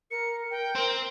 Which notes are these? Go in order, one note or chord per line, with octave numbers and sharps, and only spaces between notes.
A#4 C#7
A#4 G5
C4 A#4